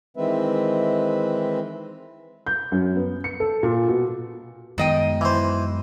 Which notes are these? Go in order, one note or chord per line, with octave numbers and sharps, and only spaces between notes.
D#3 E3 G#3 C4 B4 E5
G6
F#2
B3
C#7
A4
A#2
B2
F#2 D#3 G#3 B3 D#5 G5
E3 C5